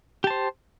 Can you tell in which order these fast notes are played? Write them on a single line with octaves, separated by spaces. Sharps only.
G4 A5 C5